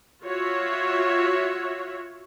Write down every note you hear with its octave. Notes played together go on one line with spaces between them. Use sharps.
F4 F#4 C#5 E5